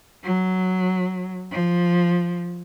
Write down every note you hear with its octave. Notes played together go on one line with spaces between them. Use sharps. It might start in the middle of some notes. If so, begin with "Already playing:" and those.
F#3
F3